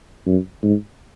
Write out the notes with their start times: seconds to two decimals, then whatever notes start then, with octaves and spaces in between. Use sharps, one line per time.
0.26 F#2
0.63 G#2